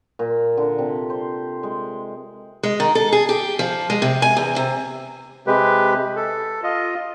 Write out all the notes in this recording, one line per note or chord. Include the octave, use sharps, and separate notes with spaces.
A#2
D3
C3
C5
G#3
G#3
D#3
A4
G#4
G4
F3
G#3
C3
G#5
E2
C3
C3 G#3 G4 B4
A4
F4 D#5